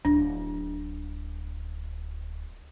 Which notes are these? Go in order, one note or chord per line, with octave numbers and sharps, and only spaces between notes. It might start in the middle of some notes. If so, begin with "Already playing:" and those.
D1 D4